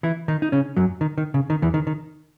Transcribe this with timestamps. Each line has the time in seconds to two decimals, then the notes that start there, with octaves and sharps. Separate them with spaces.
0.03 E3 E4
0.28 D#3 D#4
0.42 D#4
0.52 C#3 C#4
0.77 F#2 F#3
1.01 D#3
1.18 D#3
1.34 C#3
1.50 D#3
1.62 E2 E3
1.74 D#3
1.87 D#3